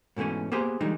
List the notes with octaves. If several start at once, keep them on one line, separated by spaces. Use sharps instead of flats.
G#2 B2 E3 A3 C#4
A#3 B3 G4 G#4 C5
D3 E3 G3 G#3 D#4